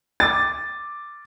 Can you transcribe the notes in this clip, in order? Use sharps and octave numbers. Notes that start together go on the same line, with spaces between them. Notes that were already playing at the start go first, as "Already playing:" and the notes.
D6 A6